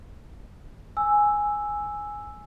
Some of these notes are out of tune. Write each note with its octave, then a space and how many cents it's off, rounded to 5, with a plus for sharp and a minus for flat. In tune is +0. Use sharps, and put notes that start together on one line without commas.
G#5 +0 E6 +0